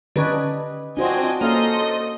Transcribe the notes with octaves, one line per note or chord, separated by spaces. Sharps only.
D3 D#3 C#4 G4 B4 D#5
C4 D4 F4 F#4 C5 D#5 G#5
A#3 C#4 A4 C5 D#5 F5